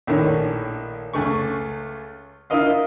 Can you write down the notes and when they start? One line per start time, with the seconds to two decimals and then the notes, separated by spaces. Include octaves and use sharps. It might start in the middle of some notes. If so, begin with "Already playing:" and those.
0.07 A#1 A2 D#3 C#5
1.13 C#2 A3 C#6
2.50 E4 F4 A#4 D#5 F5